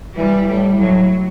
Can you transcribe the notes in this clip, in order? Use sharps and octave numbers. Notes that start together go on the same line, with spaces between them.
E3 G3
A2 G3
A2 F#3